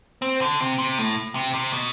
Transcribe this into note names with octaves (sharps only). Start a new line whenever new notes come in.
C4
D3
C3
C3
A2
C3
C3
B2